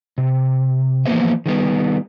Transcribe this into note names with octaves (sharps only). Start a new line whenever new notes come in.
C3
E3 F3 A#3 B3 C5 E5
D#3 G3 B3